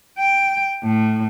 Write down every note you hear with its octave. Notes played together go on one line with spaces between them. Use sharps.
G5
A2